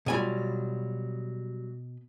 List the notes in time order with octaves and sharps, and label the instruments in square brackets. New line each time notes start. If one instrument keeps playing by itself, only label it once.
[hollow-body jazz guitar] B2 G#5 B5 [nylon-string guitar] F#3 G3 F4